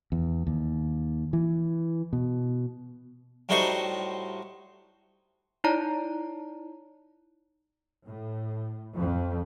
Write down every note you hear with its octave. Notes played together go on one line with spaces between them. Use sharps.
E2
D#2
E3
B2
A2 G3 D#4 F#4 C5 C#6
D#4 E4 C#5 D5 A5 A#5
A2
F2